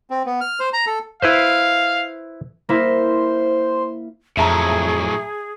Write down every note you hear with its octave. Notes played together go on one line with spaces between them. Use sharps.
C4
B3
F6
C5
A#5
A4
E4 B4 C5 F5
A#3 E4 C5
F2 A2 F#3 G#4 E5 A5 A#5